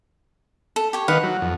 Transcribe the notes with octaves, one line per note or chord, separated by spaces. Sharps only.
A4
G4 C#5
D#3 B4 F5 F#5
F#3
F2